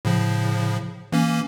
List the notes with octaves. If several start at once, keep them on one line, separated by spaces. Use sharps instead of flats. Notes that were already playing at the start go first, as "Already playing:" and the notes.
A2 C#3 F3
E3 A#3 C#4